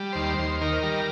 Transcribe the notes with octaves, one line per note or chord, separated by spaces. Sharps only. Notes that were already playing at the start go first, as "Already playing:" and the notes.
Already playing: G3
D#2 C5
D#2
D#3 A#4
G3